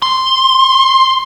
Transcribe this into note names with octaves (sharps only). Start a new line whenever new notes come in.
C6